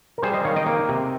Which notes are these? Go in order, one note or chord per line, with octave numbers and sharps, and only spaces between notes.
A#4
G3 G#4 C5
C5 D#5
D#3 C#5 F5
D#5 G5
A#3
C3